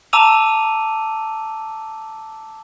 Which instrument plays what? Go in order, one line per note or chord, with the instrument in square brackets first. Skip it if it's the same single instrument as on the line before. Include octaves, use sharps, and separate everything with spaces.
[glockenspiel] A5 A#5 D6 E6 D#7 F7